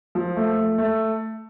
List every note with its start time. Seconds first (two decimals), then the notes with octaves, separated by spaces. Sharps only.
0.15 F3
0.36 A3
0.57 A3
0.78 A3